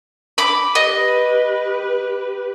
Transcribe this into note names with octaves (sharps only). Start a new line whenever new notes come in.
B5 D6
G4 B4 D#5